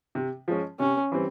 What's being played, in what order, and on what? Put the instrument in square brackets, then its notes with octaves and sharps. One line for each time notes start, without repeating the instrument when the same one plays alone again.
[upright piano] C3
F3 G#3 C#4
[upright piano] C3 [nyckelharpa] C#4
[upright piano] E3 G3 C4